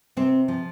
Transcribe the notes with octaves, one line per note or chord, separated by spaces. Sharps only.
C3 C4
F3